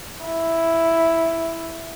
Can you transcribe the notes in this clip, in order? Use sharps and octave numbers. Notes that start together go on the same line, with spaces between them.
E4